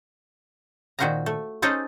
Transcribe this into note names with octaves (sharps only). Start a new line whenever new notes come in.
A#2 D#3 F#4 C5 F5 A#5
A3
C#4 D#4 G#4 A4 C5